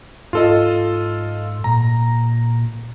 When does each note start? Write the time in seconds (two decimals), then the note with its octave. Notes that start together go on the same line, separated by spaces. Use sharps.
0.33 G#2 F4 A4 D#5
1.64 A#2 A#5